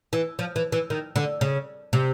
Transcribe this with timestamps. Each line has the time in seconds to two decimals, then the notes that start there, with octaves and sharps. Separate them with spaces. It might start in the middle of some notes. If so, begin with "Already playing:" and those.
0.13 E3
0.39 F3
0.56 E3
0.72 E3
0.90 D#3
1.16 D3
1.41 C#3
1.93 C3